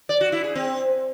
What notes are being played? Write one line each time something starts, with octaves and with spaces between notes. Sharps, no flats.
D5
F#4
E4
G#4
C4